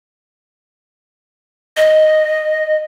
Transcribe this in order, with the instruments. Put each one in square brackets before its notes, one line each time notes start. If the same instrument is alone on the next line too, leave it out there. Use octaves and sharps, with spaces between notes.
[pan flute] D#5